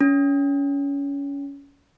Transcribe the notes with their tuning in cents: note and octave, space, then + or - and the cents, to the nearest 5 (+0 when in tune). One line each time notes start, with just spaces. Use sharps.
C#4 +25